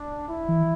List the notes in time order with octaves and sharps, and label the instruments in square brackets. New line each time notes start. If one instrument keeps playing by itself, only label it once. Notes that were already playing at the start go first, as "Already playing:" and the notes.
Already playing: [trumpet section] D4
E4
[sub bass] E3